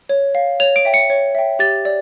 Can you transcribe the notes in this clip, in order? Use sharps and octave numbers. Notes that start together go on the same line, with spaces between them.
C#5
F5
C#5 F7
D7
E5 G5
C#7
C#5
E5 G5
G4 A6
D5